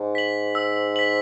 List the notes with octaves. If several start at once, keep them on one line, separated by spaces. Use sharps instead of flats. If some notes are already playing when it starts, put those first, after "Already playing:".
Already playing: G#2
B6 F#7
E6
B6 F#7